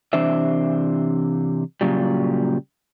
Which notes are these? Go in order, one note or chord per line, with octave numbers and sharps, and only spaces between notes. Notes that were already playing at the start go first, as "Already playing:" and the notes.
C3 E3 D4 C5 E5
A#2 C#3 F#3 G3